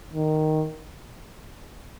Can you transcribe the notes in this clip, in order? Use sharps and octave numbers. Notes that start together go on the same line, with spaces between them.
D#3